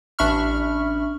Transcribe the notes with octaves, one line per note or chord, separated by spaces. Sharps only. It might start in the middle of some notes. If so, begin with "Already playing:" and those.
A1 D4 E5 B5 C#6 F6